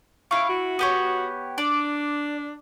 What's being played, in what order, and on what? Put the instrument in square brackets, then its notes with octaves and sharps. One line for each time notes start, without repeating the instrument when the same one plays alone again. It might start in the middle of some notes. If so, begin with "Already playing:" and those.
[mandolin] E4 C#6 [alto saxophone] F5
[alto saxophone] F#4
[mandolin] B3 G4 C#5
[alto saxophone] D4 [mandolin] D5